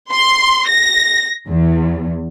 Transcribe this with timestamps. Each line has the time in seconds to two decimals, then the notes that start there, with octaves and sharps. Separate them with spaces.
0.11 C6
0.67 A#6
1.48 E2